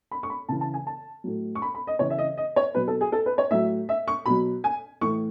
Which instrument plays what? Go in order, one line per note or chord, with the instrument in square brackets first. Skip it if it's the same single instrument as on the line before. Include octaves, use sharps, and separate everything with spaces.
[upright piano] B5
C#6
B5
C#3 E3 A5
A5
G#5
A5
A2 F#3
C#6
B5
B5
D#5
C#3 E3 C#5
E5
D#5
D#5
C#5
B2 F#3 B4
A4
G#4
A4
B4
C#5
A2 F#3 E5
E5
C#6
B2 F#3 B5
G#5
A2 E3 C#6